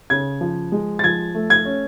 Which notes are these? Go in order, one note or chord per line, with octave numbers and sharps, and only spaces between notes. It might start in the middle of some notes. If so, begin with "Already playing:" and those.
C#3 G#6
F3
G#3
A6
F3 G#6
A3
G#6
C#4